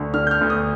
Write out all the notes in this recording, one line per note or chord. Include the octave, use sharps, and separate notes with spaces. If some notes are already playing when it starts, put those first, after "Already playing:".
Already playing: D2 D3
D3 F6
G6
F6
D2
D#6